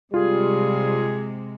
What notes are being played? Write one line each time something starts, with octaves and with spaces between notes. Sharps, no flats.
C3 G3 G#3 F4 G#4